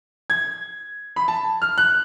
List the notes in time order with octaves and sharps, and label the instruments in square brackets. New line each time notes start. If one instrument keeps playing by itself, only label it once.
[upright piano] G#6
B5
A5
F6
F#6